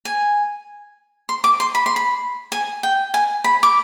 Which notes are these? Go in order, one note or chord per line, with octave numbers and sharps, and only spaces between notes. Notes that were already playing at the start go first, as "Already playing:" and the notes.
G#5
C6
D6
C6
B5
C6
B5
G#5
G5
G#5
B5
D6